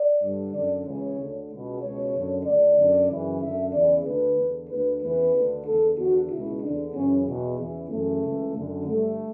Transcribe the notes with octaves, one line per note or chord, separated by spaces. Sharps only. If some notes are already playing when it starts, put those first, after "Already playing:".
Already playing: D5
G2 D3
F#2 D3 D5
C#2 C#3 E3 C#5
D2 D3
C#2 B2
C#2 B2 C#5
F#2 D3
D2 D3 D5
F#2 D3
F#2 C#3 E3
F#2 D3 E5
E2 C#3 E3 D5
D2 D3 B4
E2 D3
D2 D3 B4
E2 C#3 E3 B4
D2 D3
E2 D3 A4
E2 D3 F#4
C#2 B2 E4
E2 D3 D4
F#2 C#3 E3 C#4
E2 B2
E2 C#3 E3
F#2 C#3 E3 A3
C#2 C#3 E3
F#2 D3
G2 D3 A3